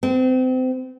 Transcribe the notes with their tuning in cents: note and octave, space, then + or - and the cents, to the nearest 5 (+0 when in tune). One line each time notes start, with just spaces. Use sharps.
C4 -30